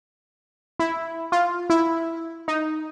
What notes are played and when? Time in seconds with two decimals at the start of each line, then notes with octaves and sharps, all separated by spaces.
0.80 E4
1.32 F4
1.70 E4
2.48 D#4